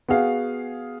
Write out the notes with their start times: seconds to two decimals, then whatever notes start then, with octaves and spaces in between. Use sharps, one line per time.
0.09 B3 F#4 G#4 F5